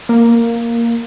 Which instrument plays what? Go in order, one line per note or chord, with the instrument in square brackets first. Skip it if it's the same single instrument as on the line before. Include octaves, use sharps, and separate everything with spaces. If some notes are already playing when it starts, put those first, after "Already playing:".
[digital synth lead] A#3